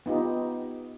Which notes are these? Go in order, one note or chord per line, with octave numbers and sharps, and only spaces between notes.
B3 D#4 F4 G4